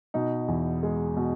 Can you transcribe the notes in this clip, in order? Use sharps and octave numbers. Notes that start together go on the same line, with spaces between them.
B2 D#4
E2
G#3
B2